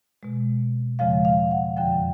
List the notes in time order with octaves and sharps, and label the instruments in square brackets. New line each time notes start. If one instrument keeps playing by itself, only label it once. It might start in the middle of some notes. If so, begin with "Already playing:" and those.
[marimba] B2 G#3
E2 C#3 F3 G#3 F5
F5
F#5
F2 D3 F3 G5